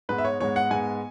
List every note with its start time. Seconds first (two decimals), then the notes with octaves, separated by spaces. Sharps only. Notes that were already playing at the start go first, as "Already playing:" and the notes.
0.09 G#2 G#3 B3 B4
0.18 E5
0.24 C#5
0.40 G#2 G#3 B3 C#5
0.56 F#5
0.70 G#2 G#3 B3 G#5